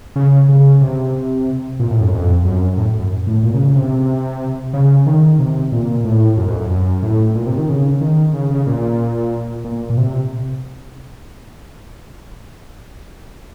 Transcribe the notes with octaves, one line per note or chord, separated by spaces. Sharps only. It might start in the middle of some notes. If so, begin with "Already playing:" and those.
C#3
C#3
C3
A#2
A2
F#2
F2
F#2
A2
F#2
A2
A#2
C#3
C#3
C3
C#3
D#3
C3
A#2
A2
F#2
F2
F#2
F#2
A2
A#2
C3
D#3
C#3
D#3
C#3
C#3
A#2
A#2
A#2
C3